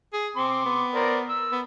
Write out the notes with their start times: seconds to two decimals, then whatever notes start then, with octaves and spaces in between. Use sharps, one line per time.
0.13 G#4
0.36 C4 C6 D6
0.65 B3
0.95 A#4 C5 D5
1.30 E6
1.52 B3